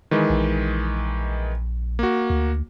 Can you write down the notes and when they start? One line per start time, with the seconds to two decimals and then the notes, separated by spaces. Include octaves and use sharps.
0.11 D#3 E3 G#3
0.30 A#1
1.99 A#3 F#4
2.30 D2